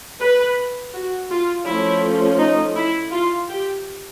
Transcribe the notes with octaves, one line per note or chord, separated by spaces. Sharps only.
B4
F#4
F4
F3 A3 C#4 E4
D#4
E4
F4
G4